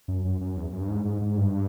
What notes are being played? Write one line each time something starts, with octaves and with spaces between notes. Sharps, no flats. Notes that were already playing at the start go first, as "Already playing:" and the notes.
F#2
F#2
F#2
E2
F#2
G2
G#2
G#2
G#2
G2